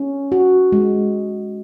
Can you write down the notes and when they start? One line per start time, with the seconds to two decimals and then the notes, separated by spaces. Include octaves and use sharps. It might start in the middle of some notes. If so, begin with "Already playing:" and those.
Already playing: C#4
0.32 F#4
0.72 G#3